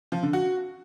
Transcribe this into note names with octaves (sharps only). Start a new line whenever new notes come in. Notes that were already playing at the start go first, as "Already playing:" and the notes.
F3
D3
F#4